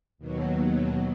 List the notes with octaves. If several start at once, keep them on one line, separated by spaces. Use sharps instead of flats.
D#2 B2 F#3